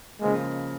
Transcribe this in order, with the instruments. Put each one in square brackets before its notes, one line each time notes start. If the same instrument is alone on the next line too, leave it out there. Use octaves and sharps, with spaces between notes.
[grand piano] C#3 F3 A#3 [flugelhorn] G#3